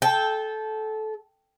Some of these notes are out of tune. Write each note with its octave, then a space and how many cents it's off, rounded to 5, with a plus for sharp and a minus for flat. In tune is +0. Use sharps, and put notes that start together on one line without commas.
A4 -20 G5 +0